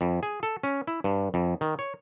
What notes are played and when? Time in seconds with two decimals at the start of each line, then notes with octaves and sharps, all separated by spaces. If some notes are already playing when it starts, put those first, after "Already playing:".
0.01 F2
0.23 G#4
0.43 A4
0.63 C#4
0.87 E4
1.04 G2
1.34 F2
1.61 D#3
1.79 C#5